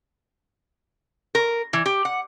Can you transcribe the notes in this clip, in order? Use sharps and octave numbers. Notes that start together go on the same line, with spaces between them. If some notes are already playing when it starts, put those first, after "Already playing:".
A#4
E3
G4
F#5